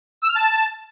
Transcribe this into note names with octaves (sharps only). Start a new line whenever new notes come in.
E6
F6
A5